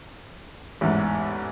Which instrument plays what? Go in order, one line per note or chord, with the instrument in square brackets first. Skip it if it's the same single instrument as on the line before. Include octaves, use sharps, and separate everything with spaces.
[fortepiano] A1 E2 G#2